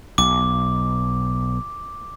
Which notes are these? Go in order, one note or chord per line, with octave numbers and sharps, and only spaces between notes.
B1 D6